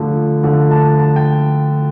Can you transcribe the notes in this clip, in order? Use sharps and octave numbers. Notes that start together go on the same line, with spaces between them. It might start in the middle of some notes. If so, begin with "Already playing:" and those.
Already playing: D3 F3 A3
D3 F3 A3
A5
A5
G5